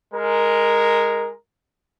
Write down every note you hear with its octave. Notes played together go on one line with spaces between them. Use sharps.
G#3 A#4